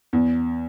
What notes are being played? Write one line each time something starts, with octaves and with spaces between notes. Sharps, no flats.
E2